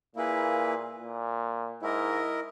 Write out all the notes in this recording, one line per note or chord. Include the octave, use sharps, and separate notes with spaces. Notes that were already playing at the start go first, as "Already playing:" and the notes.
A#2 A#3 E4 G#4 B4
A#2
G#2 E4 A#4 D#5